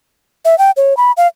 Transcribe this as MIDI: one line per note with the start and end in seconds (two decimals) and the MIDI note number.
0.45 0.58 76
0.58 0.71 79
0.77 0.97 73
0.97 1.12 83
1.17 1.27 77